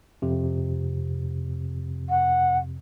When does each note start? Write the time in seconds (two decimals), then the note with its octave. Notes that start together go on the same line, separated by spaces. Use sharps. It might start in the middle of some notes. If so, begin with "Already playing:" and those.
0.22 F2 C3
2.09 F#5